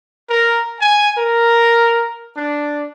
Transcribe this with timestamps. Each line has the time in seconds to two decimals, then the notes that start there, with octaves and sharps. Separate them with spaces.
0.30 A#4
0.80 G#5
1.18 A#4
2.37 D4